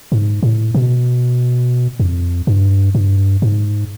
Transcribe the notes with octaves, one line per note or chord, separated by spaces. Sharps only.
G#2
A2
B2
F2
G2
G2
G#2